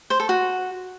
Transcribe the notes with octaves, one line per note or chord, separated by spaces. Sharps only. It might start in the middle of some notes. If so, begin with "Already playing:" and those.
C5
A4
F#4